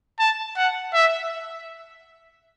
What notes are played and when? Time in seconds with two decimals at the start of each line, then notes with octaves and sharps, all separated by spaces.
0.19 A5
0.57 F#5
0.94 E5